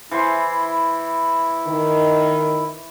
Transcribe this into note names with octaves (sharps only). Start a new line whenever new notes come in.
E3 E4 C5 C6
D#3